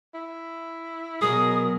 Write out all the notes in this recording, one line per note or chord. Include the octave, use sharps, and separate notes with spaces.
E4
B2 F#3 G#4 A#4 D#6